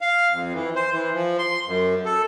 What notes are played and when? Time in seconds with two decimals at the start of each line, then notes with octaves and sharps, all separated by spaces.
0.01 F5
0.32 F2
0.54 E3
0.76 C5
0.93 E3
1.14 F3
1.38 C6
1.67 F#2
2.05 A4